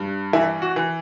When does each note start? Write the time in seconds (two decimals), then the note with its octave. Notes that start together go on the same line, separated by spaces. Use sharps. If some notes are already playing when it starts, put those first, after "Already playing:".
Already playing: G2
0.33 E3 E4
0.62 F#4
0.76 E3